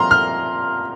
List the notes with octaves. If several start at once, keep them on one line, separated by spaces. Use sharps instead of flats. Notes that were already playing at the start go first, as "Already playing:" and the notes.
Already playing: A#2 F3 C4 A#5 C6 F6
F6